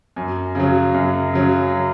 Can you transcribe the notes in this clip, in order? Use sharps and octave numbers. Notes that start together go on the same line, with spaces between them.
F#2
C#3 F#3
F#2
C#3 F#3